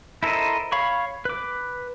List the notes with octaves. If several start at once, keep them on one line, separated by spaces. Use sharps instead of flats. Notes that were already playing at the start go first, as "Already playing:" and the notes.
E4 A4 A#4 C5 D#5
C#5 F5 B5 C#6
B4 D6